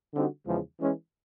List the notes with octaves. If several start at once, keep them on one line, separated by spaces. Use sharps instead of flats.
D3 G3 C4 D#4 F#4
E2 C#3 F3 G#3
E3 G#3 C#4